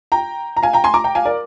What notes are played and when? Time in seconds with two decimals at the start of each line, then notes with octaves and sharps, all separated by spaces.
0.12 G5 A#5
0.57 A#5
0.63 F5 G#5
0.73 G5 A#5
0.84 G#5 C6
0.94 A#5 D6
1.04 G5 A#5
1.15 F5 G#5
1.25 A#4 D5